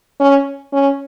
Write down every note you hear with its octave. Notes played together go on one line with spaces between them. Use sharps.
C#4
C#4